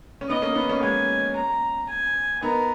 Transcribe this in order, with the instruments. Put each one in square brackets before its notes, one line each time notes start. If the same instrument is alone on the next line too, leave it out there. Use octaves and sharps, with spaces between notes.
[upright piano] C#4
[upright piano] B3 D#4 [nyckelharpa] D#5
[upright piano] A#3 C#4
B3 D#4
A#3 C#4
[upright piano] G#3 [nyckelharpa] G#5
[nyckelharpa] A#5
G#5
[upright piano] B3 D#4 [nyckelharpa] A#4